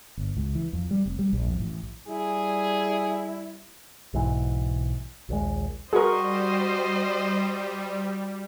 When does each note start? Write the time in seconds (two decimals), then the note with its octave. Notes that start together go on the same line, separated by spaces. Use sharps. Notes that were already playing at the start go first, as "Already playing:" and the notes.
0.17 G1
0.37 C#2
0.55 E3
0.73 F2
0.91 G3
1.05 F1
1.19 G3
1.33 A#1
1.47 F2
1.60 A1
2.08 G3 E4 G#4
4.14 B1 G#2 E3
5.29 A#1 D#2 G#3
5.93 G3 F#4 G#4 A#4 C5 D#5 C#6